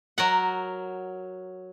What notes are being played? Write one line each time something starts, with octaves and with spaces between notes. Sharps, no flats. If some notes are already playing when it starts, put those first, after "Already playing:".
F#3 A#4 F#5